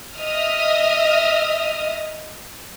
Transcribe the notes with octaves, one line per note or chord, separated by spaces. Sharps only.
D#5 E5 D#6 F6